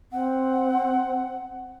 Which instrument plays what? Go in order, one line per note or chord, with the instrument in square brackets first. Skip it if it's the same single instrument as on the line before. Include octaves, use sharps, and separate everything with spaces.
[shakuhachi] C4 [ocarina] F#5